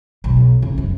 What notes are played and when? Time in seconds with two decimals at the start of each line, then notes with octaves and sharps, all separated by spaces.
0.24 B1
0.62 C#3
0.78 F#2